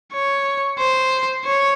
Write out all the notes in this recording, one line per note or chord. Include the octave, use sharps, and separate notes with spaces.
C#5
C5
C#5